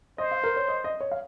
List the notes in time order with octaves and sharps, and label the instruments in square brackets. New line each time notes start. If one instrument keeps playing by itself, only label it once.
[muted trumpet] C5 [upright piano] D#5
[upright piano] F5
A#4
C#5
D#5
D#5
C#5
F5